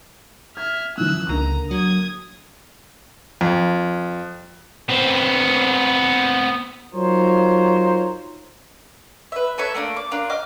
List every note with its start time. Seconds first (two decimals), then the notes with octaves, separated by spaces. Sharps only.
0.57 E5 F6 G#6
0.98 F#2 E3 F3 E6 F#6
1.29 C#2 D3 A#3 A#5 D#7
1.71 F#3 D#6 G#6
3.41 F2
4.89 B3 C4
6.94 F#3 D#4 F4 A#4 C5 C#5
9.32 B4 E5
9.58 A4 B4 C#5 E5
9.74 A3 A#3 D4 D#6
9.96 D6
10.11 D4 F4 A#4
10.29 D#5 G5 D6 F6